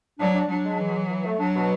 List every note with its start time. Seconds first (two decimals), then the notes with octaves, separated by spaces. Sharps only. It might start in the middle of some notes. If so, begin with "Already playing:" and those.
0.20 F#3 D4
0.35 D4
0.49 F#3 D4
0.65 G#3
0.80 E3
0.94 E3
1.10 E3
1.25 A3
1.39 F#3 D4
1.54 B2